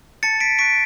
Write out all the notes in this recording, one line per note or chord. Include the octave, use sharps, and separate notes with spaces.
A5 A6 C#7
B6 D7
C#6 F#6 B6 D7